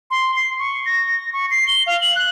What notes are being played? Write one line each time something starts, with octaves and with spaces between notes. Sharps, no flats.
C6
C7
C#6
A#6
C#6
C7
G7
F5
F#7
F#6